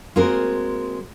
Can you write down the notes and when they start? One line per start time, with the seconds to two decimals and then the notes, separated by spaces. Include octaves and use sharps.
0.16 G#3 A#3 C4 F#4 A#4